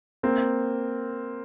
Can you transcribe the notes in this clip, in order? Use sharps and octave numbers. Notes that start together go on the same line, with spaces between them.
A#3 C4